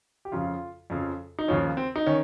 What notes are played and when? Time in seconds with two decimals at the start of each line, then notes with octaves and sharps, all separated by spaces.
0.25 G4
0.32 F2 C#3 F3 F4
0.90 F2 C#3 F3
1.39 D#4
1.48 D#2 C#3 F3 C#4
1.77 C4
1.96 D#4
2.06 D#3 C#4